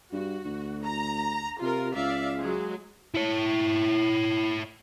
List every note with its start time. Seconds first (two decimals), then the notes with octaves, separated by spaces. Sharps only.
0.13 G2 F#4
0.45 D2
0.84 A#5
1.62 C3 F4 A#4
1.95 C#2 D5 E5 F5
2.38 F#3 G#3 G#4
3.15 E4 C#5